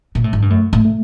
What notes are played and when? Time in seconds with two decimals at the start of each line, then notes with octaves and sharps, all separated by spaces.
0.15 A#2
0.24 A2
0.33 G#2
0.42 G2
0.50 F#2 A3
0.73 A2
0.85 A3